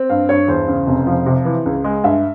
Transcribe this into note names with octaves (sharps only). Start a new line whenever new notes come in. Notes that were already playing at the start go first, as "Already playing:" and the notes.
Already playing: C4
G2 F5
G2 C#5
E2 C5
C#3
F1
F3
C3
E3
C#2
G#3
G2 E5